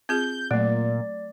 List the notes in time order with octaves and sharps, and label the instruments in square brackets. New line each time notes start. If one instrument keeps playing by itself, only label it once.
[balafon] C4 F4 G#4 [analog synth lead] G6
[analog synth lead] A#2 [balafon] F#3 A3 [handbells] D5